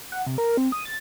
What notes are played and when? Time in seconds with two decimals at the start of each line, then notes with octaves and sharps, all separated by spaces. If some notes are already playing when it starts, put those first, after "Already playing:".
0.12 F#5
0.27 C3
0.38 A#4
0.57 C4
0.72 D#6
0.85 A6